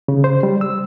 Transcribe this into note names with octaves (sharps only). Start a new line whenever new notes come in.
C#3
C5
G3
E6